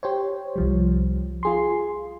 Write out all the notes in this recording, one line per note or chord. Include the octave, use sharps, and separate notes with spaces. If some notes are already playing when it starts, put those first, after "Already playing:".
G4 C5 C#5
C2 F3 G3
F4 G#4 C6